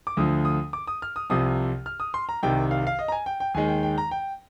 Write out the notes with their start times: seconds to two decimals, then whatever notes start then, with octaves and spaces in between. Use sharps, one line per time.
0.07 D6
0.17 D2 D3 F3 D#6
0.45 D#6
0.73 D6
0.87 D#6
1.02 F6
1.16 D#6
1.30 C2 C3 F3 D#6
1.86 F6
2.00 D#6
2.14 C6
2.29 A#5
2.43 C2 C3 D#3 G5
2.71 F5
2.87 F5
2.99 D#5
3.08 A#5
3.12 G#5
3.26 G5
3.40 G5
3.54 D#2 D#3 G#3 G#5
3.69 G5
3.83 G5
3.98 A#5
4.11 G5